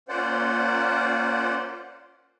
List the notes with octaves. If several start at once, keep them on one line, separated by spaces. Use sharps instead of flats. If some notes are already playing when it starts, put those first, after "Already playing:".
A#3 C#4 F4 C5 D5 F#5